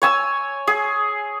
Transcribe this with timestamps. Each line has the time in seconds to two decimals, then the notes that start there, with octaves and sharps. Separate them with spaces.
0.02 C#5 G#5 E6
0.67 G#4